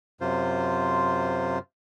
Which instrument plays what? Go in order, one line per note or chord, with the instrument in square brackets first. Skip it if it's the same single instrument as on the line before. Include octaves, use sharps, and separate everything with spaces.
[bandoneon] F#2 C3 F4 C5